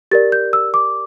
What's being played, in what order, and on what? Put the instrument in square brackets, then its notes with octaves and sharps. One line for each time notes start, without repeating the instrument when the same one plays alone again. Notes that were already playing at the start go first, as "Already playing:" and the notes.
[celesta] G4 A#4 D5 A6
G6
E6
D6